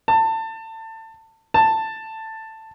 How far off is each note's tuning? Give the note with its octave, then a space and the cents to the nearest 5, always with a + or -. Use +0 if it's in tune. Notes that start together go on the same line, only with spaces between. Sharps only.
A5 +25
A5 +10